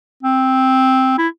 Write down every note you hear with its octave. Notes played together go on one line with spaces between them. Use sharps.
C4
E4